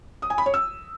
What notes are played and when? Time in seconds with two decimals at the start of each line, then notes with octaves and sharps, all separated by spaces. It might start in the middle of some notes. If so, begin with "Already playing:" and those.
0.22 D#6
0.30 G#5
0.38 B5
0.46 C#5
0.54 E6